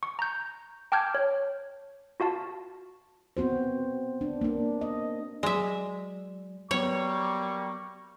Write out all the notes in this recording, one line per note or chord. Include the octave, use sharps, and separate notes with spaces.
C#6
A#5 G6
G5 A5 D6 F6 G6 G#6
C#5
F4 F#4 F5 A5
B3 C4 F#4 C5
D4
A#3 D4
D#5
F#3 G#3 D5 E5
F#3 G3 A#3 B3 C#5 C#6